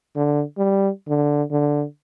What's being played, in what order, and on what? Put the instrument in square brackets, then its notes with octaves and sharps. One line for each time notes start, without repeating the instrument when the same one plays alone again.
[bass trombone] D3
G3
D3
D3